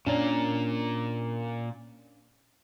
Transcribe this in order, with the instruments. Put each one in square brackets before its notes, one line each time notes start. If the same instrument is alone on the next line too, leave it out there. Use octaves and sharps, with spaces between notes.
[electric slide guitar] A#2 A#3 [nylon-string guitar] C#4 D4